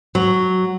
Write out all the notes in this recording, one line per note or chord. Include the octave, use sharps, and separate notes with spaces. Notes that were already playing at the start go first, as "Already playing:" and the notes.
F#3